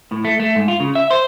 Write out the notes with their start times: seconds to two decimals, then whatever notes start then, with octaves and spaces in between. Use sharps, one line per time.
0.12 A2
0.25 A3
0.40 A3
0.55 G#2
0.68 F4
0.80 C#3
0.95 E5
1.11 C5